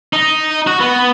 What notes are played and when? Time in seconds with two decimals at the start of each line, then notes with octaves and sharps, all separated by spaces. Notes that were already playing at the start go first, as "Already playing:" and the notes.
0.13 D#4
0.67 F#4
0.80 B3